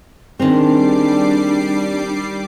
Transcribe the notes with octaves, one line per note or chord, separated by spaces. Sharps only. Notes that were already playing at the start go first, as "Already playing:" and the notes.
D#3 G3 G#3 C4 D4 A#5 D6 C7